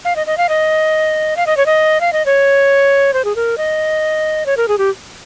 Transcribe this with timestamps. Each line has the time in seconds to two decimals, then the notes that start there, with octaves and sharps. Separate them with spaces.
0.05 F5
0.16 D#5
0.27 D#5
0.38 F5
0.49 D#5
1.37 F5
1.47 D#5
1.57 C#5
1.66 D#5
2.01 F5
2.13 D#5
2.26 C#5
3.14 C5
3.25 G#4
3.36 A#4
3.58 D#5
4.46 C#5
4.57 A#4
4.68 G#4
4.78 G4